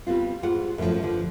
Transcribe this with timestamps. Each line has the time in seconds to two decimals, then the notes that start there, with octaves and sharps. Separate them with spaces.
0.07 G3 B3 C4 F4
0.43 G#2 G3 F4 F#5
0.78 F#2 A2 D3 E3 F3
1.02 G2 D3 F3